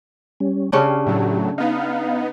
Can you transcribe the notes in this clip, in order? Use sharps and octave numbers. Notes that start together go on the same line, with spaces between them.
G3 C#4
C#3 C#4 D4 G4
A2 F#3 A3
B3 D#4 F5